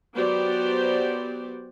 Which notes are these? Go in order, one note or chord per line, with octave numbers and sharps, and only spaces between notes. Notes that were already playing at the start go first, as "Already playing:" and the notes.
F#3 B3 F#4 G4 C5 D5